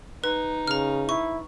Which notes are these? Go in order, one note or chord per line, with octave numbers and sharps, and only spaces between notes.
D#4 B4
C#3 A#5 F6
E4 C#6